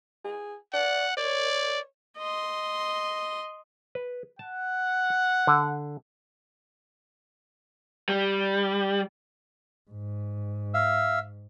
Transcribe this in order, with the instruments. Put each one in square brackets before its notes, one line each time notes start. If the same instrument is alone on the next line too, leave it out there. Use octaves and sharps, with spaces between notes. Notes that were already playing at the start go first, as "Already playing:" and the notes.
[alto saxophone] G#4
[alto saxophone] D5 [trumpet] F#5
[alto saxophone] C#5 [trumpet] D5
[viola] D#5 C6
[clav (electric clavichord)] B4
[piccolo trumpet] F#5 [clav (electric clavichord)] A5
[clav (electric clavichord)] D3
[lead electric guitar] G3
[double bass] G#2
[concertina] E5 F5